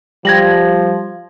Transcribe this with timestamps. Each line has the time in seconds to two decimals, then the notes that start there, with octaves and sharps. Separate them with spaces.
0.25 F3 G3 G#6 A#6 F#7